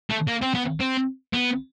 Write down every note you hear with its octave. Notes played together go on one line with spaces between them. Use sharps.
A3
A#3
C4
B3
C4
B3